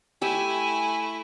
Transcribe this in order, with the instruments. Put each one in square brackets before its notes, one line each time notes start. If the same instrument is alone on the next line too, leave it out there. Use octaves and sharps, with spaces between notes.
[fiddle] A3 E4 [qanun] G4 E5 G5 [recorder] G#5